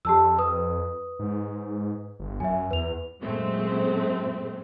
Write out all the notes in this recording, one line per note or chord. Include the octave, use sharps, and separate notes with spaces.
F2 G4 A5 E6
B4 D#6
G#2
G1
F#2 E5 G#5
E2 B4 F7
F#2 A#2 G#3 A3 C4